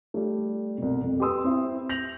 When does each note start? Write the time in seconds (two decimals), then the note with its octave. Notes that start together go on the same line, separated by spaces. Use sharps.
0.14 G3 A3
0.78 C2 B2
1.02 F2
1.20 G4 B4 C6 D#6 E6
1.44 C4 E4
1.89 G6 A#6 F7 F#7